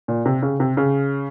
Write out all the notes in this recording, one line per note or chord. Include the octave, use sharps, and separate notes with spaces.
A#2
C3
C#3
C3
C#3